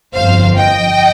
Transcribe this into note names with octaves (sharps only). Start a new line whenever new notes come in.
G1 F2 F3 C5 F5
D#5 G5